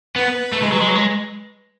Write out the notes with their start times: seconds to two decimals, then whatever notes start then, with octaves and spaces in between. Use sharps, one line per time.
0.16 B3 B4
0.53 A3
0.62 G#3
0.72 F#3
0.81 G#3
0.88 F#3
0.95 G#3